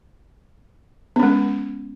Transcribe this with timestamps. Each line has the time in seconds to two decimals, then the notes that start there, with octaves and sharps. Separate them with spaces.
1.16 B3
1.19 C#4
1.23 G#3